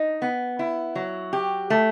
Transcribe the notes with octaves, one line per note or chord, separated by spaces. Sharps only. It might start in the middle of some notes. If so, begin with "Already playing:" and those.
Already playing: D#4
B3
E4
F#3
G4
A3